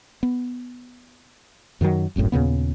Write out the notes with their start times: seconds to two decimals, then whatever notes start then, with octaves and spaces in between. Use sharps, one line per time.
0.23 B3
1.81 F#2 D#3 F3 F#3
2.16 D1 G#1 F#2 A2
2.32 D#2 A#2 C#3 B3